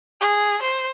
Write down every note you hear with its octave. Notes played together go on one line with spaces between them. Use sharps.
G#4
C5